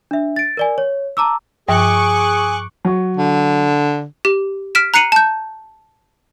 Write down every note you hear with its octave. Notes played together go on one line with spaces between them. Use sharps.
D4 E5
A6 D7
A#4 D5 G#5
C#5
A5 A#5 D6 E6
G2 F3 G#4 G#5 C#6 D6 F#6
F#3 C#6
D3
G4
F6 B6 D7 E7
A#5 F#6 C7 C#7 D#7 F#7
A5 G6